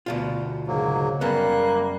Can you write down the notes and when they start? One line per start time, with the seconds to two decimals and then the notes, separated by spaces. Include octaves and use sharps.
0.06 D2 B2 F4
0.67 G#2 C#3 F#3 A#3
1.21 F#2 C#3 G3 A#3 B3 F#6